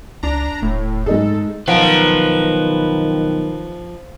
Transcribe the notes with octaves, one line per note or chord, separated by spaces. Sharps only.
C#2 D4 A#5
D#1 A2
G#2 G#3 D#4 G#4 A4
B1 D#3 F3 B4 F5 F#5 A#5